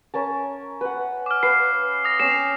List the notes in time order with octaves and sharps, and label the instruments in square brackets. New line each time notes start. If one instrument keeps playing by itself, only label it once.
[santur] C#4 A#4 A5
B4 F#5
[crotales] D6 F6
[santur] B4 F5 [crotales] C7
[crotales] D#6 A#6
[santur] C4 C#4 D6 [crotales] C7 E7